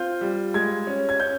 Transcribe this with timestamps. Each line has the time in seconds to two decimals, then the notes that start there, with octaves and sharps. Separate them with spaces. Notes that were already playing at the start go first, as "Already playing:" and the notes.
Already playing: C4 F4 G6
0.21 G3
0.54 G#3 G#6
0.87 C#4
1.09 G#6
1.19 C#4 G6